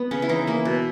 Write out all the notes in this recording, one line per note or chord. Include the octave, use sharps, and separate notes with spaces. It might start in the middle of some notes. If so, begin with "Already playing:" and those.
Already playing: B3
C#3 C#4
E4
E3 D#4
A#3 E4
B2